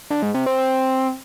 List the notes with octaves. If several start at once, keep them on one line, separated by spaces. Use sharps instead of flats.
D3
G#2
C3
C4
C4